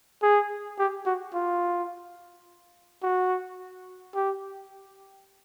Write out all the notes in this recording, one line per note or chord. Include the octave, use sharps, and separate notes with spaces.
G#4
G4
F#4
F4
F#4
G4